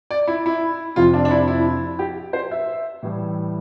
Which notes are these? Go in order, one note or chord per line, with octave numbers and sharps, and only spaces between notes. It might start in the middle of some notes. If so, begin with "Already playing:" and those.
D5
E4
E4
F2 C3 F3 F4
D4
D4
E4
E4
G4
C5
E5
A2 E3 G3